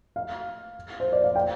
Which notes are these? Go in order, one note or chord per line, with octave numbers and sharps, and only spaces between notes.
F5
C5
D5
F5
G5